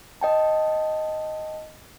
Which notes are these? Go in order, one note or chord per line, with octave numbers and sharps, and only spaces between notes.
D#5 G5 A5